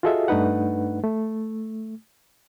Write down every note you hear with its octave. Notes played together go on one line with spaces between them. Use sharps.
F4 F#4 G#4 A4 D#5 E5
G2 A3 D4 D#4 B4 F#5
A3